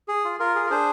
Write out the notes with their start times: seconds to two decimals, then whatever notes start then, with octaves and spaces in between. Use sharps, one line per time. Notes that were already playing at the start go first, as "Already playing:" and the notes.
0.08 G#4
0.25 F4
0.40 F4 A#4
0.55 G#4
0.67 A#4
0.70 D4 G#4 C5